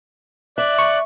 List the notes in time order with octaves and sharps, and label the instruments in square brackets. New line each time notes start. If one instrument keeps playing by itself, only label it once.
[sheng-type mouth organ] D5 F#6 [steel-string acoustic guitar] E5
[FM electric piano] C#6